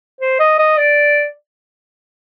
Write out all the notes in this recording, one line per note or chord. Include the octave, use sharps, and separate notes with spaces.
C5
D#5
D#5
D5